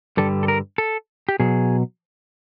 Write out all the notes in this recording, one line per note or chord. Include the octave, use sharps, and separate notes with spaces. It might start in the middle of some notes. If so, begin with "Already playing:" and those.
G2 D3 G3 A4
A4
A#4
A4
G4
B2 F#3 G#4